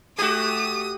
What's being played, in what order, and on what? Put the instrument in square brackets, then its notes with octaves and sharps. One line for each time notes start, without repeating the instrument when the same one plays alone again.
[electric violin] A3 [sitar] F#4 G4 [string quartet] D#6